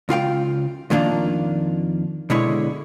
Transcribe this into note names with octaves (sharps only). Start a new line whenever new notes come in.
C#2 F4 F5 G5
F2 D#3 A#3 D4 F4
B2 D3 G#3 E4 C#5